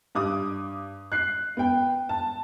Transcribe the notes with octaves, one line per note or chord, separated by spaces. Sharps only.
G2 D6 D#6
F#6 C7
B3 G5
A5